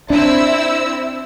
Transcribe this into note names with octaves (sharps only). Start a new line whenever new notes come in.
C4 D4 E4 E6